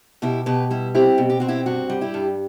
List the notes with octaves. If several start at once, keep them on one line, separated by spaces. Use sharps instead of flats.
B2 E4 G4
B2 G4 B4
G3 E4
C4 E4 G4
B2
G4
C4 F#4
E4 G4
G2 F#4
G3
E4 G4
G2